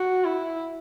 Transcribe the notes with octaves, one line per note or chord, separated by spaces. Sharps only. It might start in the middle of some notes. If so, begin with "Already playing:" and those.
Already playing: F#4
E4